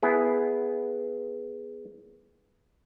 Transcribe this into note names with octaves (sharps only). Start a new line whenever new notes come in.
B3 E4 G#4